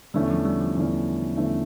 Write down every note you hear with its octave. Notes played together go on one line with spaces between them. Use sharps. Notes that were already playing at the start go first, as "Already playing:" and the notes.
E2 D3 G3 A3 C#4
F3
G3
F3
E2 D3 A3 C#4
E2 D3 A3 C#4